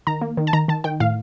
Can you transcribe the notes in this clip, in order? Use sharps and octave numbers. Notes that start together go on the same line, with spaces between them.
D#3 A#5
A#3
D#3
A5
D#3 A#5
D#3 A5
D#3 G5
A2 F5